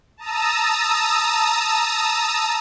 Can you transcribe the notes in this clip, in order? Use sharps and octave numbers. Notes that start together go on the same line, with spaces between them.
A5 A#5 D#6 E6